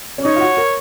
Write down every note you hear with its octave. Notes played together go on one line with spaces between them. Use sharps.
C#4
D#4 C#5
F4
F#4
A#4